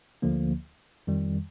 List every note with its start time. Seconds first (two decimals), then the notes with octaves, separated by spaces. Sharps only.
0.22 D2 D3 F3 A#3
1.07 F2 D#3 G3